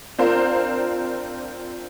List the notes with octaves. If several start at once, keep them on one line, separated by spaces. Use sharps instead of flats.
C4 D4 F4 A#4 C5